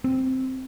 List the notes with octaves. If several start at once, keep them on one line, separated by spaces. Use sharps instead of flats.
C4